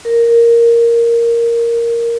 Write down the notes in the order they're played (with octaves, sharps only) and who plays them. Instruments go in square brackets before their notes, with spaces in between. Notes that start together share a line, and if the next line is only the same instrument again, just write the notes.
[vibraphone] A#4